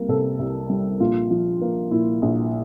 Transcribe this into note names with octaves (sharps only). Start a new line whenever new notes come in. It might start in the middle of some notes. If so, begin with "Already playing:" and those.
Already playing: C2 G3 A#3 A#4
C3 A4
C2
G3
A#1 F4
F3
A#3
A#2 E4
A#1